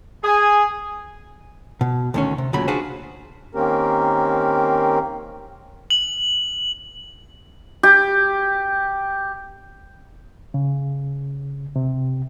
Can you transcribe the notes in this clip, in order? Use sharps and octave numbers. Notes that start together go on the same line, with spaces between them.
G#4 G#5
B2
D2 D#3 C#4
C3
D2 A#2 C#3 F#3 B5
D4 F4 F#4 G#4 B4 C5
D#3 A#3 C4 C#4 G4 A#4
F#7
G4
C#3
C3